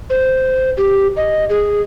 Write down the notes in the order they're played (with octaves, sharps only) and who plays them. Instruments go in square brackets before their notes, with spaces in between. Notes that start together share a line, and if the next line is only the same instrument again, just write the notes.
[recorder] C5
G4
D#5
G#4